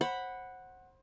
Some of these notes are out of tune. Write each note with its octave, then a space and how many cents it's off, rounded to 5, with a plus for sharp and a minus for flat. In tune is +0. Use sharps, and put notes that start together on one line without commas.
C5 +30 F#5 +0 B5 +0